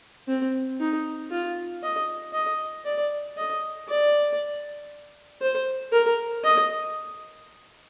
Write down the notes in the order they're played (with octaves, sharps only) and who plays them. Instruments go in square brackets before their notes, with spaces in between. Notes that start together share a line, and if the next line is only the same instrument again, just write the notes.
[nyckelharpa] C4
D#4
F4
D#5
D#5
D5
D#5
D5
C5
A#4
D#5